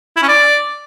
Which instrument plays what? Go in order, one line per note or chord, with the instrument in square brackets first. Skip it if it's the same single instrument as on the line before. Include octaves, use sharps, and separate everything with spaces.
[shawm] E4
C#4
D5